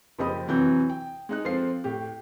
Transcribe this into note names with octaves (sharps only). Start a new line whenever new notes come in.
F#1 F3 G4 D#5 B5 D#6
F2 C3 E3 F#3 G6
G5
G#3 D#4 F#6
F3 C4 F4 A4 C7
A2 G4